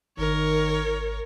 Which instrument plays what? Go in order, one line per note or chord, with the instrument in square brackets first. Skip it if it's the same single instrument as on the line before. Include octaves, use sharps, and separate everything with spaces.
[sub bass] G#1 [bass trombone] D#3 [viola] A#4 C#5